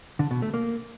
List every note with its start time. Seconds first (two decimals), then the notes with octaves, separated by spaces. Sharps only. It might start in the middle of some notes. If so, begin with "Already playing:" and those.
0.19 D3
0.31 B2
0.42 A3
0.54 A#3